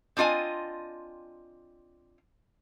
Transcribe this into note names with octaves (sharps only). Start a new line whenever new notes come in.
C4 D4 F4 D#5 G#5